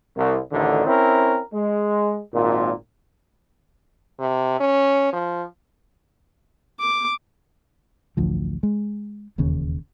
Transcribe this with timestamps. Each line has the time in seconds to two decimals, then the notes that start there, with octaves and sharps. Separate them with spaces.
0.17 C2
0.52 A1 D2 D3 D#3
0.86 C4 C#4 E4 A#4
1.54 G#3
2.34 G#1 A#2
4.20 C3
4.60 C#4
5.13 F3
6.80 D6
8.17 A1 D2 F3
8.63 G#3
9.38 E1 D#2 C#3 C#4